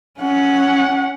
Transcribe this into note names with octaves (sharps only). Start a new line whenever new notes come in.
C#4 F#5